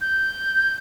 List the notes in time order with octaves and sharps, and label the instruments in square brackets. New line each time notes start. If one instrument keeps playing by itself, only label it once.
[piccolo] G6